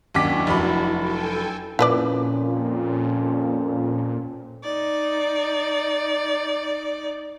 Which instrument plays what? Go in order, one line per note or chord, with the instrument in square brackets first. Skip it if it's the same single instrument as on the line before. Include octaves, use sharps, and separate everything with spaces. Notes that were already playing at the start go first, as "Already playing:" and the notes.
[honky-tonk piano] D#2 D6 B6 [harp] F#3 C#4 D4 [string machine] E4 F#4
[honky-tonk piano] F1 B5
[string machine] A4 G5 G#5
[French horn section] F2 C#4 [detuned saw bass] A#2 [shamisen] E4 B4 D5
[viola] D#4 D5